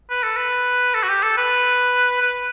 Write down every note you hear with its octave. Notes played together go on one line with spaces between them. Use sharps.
B4
A4
B4
A4
F#4
G4
A4
B4
B4